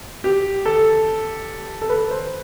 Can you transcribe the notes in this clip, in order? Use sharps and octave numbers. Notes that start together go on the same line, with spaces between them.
G4
A4
A4
B4
C5